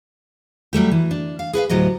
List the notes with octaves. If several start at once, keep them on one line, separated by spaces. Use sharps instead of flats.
F#3 G3 A3 G4
E3
D4
F5
G#4 B4 C#5 F5
D2 A2 F#3 G4 D#5